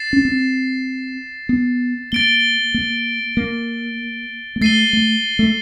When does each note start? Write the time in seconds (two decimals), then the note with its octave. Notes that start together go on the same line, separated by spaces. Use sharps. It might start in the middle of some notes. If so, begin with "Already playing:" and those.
Already playing: A6 C7 E7
0.13 C#4
0.25 C4
1.49 B3
2.12 A#3 A6 D7 G7
2.74 A#3
3.37 A#3
4.56 A#3
4.61 A3 A6 C7 D#7 G7
4.93 A3
5.39 A3